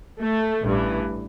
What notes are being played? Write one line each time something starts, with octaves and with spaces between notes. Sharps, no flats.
A3
A1 G2 E3